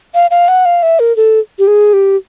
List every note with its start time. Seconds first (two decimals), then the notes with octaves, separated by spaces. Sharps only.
0.15 F5
0.31 F5
0.48 F#5
0.65 F5
0.83 E5
1.00 A#4
1.17 A4
1.59 G4
1.67 G#4
1.93 G4